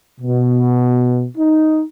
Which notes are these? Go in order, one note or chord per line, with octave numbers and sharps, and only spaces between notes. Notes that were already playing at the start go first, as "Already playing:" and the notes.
B2
D#4